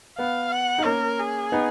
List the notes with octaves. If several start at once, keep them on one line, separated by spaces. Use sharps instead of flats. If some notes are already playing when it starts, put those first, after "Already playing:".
B3 F5
F#5
D#4
A#3 C#4 A#4
G#4
B3 D#4